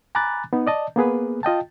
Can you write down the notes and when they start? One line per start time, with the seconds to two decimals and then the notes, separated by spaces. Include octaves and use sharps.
0.15 G#5 A#5 B5 D6 F#6 A6
0.53 B3 D#4
0.67 D5 D#5 A5
0.96 A#3 B3 G#4 B4
1.43 F4 D#5 G5 A5